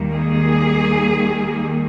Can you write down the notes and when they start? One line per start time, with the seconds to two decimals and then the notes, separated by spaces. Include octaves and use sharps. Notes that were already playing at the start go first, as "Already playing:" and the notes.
Already playing: D#2 D#3 G3 A#3
0.14 G#4